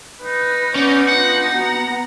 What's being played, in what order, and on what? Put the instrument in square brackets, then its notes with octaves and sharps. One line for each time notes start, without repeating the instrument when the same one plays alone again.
[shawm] D#4 [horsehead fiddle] B4
[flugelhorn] B3 [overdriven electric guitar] C#4 [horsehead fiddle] D5
[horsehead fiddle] D4 F4 [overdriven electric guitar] F#5
[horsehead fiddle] B3 A#5 [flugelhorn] F#4